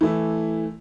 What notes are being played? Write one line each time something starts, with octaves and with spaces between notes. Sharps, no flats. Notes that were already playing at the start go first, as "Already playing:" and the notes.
E3 A3 E4